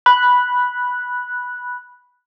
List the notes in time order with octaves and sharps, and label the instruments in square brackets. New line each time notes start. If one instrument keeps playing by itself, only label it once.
[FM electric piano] B5 F#6